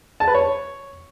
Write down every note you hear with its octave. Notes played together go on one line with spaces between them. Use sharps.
A5
B4
C#5